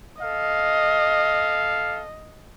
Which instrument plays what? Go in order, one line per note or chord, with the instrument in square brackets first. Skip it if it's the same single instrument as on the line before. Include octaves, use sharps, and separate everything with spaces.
[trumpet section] A4 F5 [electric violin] D#5